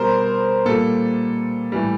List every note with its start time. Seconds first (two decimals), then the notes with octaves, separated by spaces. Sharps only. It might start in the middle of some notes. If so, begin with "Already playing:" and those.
Already playing: B2 G3 A#4 C5
0.65 A#2 G3 A4
1.72 A2 E3 G3